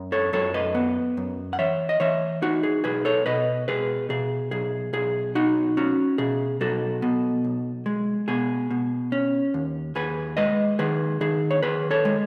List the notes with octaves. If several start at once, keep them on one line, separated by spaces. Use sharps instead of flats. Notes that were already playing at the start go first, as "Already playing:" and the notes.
Already playing: F#2
A4 C#5
F#2 A4 C#5
B4 D#5
B3
F#2
F#5
E3 C#5 E5
D#5
E3 C#5 E5
D#4 F#4
G#4
B1 G#4 B4
A4 C#5
B2 B4 D#5
B2 G#4 B4
B2 G#4
B1 G#4
B1 G#4
D#4 F#4
C#4 F#4
B2 G#4
B1 F#4 A4
B2
B1
G#3
B2 G#4
B2
C#4
D#2
D#2 G#4 B4
G#3 B4 D#5
D#3 G#4 B4
D#3 G#4
C#5
D#3 G#4 B4
A4 C#5
G#3